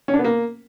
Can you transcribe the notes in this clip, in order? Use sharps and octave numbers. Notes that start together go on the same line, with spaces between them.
C#4
D4
B3
A#3